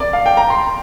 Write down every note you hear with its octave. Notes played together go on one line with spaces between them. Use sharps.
D5
F5
G5
A#5
C6